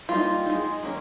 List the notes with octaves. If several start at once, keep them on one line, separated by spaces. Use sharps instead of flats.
G3 A#3 D#4 F4
G#3 D#4
D#3 A#3 C#4